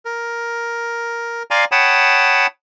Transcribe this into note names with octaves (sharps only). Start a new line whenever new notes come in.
A#4
D5 F5 G#5 A#5 C6
C#5 F#5 G5 A5 B5 D#6